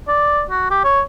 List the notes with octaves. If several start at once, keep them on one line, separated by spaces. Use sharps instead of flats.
D5
F#4
G4
C#5